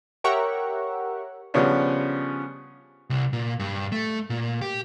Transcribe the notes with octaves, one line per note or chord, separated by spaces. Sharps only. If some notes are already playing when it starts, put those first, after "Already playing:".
G4 A#4 C#5 E5 F#5 C#6
C#3 F3 G3 B3 C#4 D4
C2
A#2
G2
A3
A#2
G4